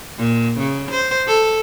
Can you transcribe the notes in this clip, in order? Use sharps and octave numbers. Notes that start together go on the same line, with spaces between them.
A#2
C#3
C5
A4